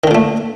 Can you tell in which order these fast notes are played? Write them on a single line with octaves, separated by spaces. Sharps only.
D#3 D3 A#2 A3